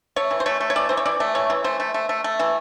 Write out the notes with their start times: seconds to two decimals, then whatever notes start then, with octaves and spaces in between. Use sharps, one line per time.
0.16 A3 C#5
0.31 E3
0.40 C5
0.46 A3 C#5
0.61 A3
0.70 C#5
0.76 E3 D5
0.89 E3 C5
0.97 C#5
1.06 E3 D5
1.20 A3
1.35 E3 C#5
1.50 E3
1.64 A3 C5
1.80 A3
1.94 A3
2.09 A3
2.24 A3
2.40 E3